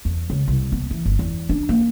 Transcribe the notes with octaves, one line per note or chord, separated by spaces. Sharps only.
E2
C#2
C2
B3
E3
G1
E2
D4
A#3